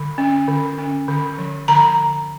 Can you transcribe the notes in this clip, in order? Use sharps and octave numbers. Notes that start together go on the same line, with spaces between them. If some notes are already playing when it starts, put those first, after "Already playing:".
Already playing: D3
C#4
D3
C#4
D3
F3
D3 A#5